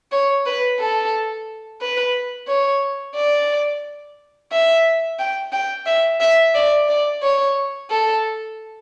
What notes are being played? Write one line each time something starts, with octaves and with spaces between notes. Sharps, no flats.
C#5
B4
A4
B4
C#5
D5
E5
G5
G5
E5
E5
D5
D5
C#5
A4